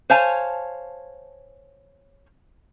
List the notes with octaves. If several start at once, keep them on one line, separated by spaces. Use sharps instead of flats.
C5 C#5 F5 G#5 A5